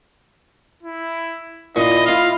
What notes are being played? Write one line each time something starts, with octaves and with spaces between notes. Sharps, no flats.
E4
A#2 E4 D#5
F4 D#5 F5